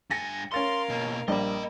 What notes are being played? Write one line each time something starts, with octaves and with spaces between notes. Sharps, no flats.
G2 G#5 A6 A#6 C#7
C#4 A#4 F5 C6 A6 C#7
B2 A#3
A#1 G3 A#3 D5 D#5 B5